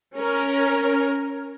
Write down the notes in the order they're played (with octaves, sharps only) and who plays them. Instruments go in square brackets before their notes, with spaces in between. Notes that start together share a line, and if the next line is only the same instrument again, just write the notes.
[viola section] C#4 A#4